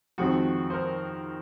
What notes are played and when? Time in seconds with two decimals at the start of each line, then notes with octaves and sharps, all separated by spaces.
0.18 F2 D#3 G#3 C4 F#4
0.70 C5
0.74 A#4